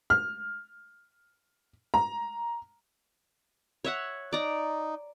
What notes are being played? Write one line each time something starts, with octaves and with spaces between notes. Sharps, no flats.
F6
A#5
C#5 E5 F#5
D#4 D5 A#5